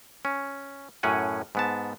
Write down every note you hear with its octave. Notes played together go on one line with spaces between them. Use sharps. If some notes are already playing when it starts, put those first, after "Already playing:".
C#4
F#2 A2 C#4 F#5 G#5
G#2 B3 A5